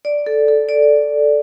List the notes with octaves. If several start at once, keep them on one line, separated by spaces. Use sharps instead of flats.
D5
A4
A4
D5